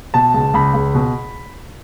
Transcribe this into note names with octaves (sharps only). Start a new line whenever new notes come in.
B2 A5
C#2
C#2 B5
C#2
B2